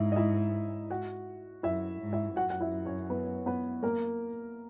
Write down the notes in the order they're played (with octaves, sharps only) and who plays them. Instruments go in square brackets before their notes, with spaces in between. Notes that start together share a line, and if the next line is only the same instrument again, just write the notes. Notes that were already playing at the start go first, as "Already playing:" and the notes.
Already playing: [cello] G#2 [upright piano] D#4 E4 E5
[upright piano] D#5
E4 E5
F#4 F#5
[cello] F#2 [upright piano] E4 E5
[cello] G#2
[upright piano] E4 E5
[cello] F#2 [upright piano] F#4 F#5
[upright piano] F#5
E4 E5
C#4 C#5
B3 B4
B3 B4
A#3 A#4